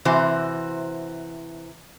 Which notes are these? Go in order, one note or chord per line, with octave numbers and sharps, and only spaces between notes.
C3 E3 F#4 C5